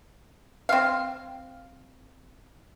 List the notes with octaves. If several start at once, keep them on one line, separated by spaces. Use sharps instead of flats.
C4 F5